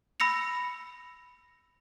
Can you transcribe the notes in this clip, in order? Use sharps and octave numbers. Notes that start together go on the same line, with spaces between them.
B5 E6 A#6 C#7 F7